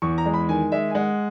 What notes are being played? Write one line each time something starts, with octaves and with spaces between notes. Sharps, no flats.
E2 C#6
A#5
G#3
B5
D#3 G#5
G#3 E5
G#5
G#3 F#5